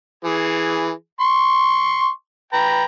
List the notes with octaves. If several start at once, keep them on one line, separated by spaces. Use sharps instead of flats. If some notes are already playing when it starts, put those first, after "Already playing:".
E3 G#4
C6 C#6
B4 G5 A#5